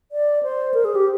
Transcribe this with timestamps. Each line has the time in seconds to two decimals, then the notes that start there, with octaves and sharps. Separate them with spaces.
0.12 D5
0.43 C5
0.74 A#4
0.85 G#4
0.95 G4